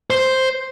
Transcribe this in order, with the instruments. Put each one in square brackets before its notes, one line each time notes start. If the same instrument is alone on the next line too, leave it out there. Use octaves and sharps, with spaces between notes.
[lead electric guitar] C5